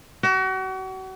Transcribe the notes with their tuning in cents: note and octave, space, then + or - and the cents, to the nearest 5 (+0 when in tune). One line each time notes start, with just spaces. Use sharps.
F#4 +35